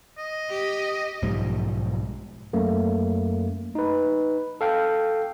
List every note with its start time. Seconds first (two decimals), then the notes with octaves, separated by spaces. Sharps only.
0.18 D#5
0.50 G4
1.22 B1 G#2 F3 G3
2.53 F#2 A3 A#3
3.75 D#4 B4
4.61 A4 F5 G5